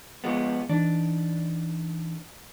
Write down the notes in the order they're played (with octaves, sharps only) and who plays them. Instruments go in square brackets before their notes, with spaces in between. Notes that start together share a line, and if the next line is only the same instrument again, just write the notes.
[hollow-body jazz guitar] F3 G#3 B3
[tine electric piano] E3 D#4 [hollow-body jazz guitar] D4